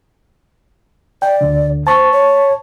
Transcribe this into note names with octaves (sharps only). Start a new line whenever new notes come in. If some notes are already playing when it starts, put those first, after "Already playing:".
D5 G5
D2 D3
C5 A5 C#6
C#5